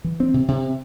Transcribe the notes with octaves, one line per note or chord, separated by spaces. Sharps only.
E3
C4
C3
C3